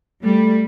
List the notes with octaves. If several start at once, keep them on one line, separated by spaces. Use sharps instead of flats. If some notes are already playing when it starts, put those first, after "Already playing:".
G3 A3